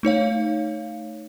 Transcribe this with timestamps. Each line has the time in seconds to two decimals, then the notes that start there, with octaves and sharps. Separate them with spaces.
0.03 A3 D#4 C#5 F5